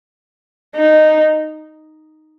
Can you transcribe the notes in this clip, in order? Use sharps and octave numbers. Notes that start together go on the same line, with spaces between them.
D#4